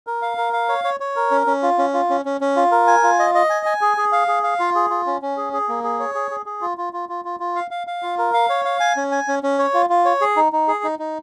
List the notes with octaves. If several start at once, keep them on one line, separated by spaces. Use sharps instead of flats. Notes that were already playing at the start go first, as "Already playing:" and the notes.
A#4
F5
A#4
F5
C#5
C#5
C#5
A#4
C#4
C#4
F4
C#4
F4
C#4
C#4
C#4
F4
A#4
G#5
F4
D#5
D#5
G#5
G#5
G#4
G#4
F5
G#4
F5
F4
G#4
F4
C#4
C#4
G#4
G#4
A#3
G#4
C#5
G#4
G#4
G#4
F4
F4
F4
F4
F4
F4
F5
F5
F5
F4
A#4
F5
C#5
F5
G#5
C#4
G#5
C#4
C#4
C#5
F4
F4
C#5
G#4
D#4
D#4
G#4
D#4
D#4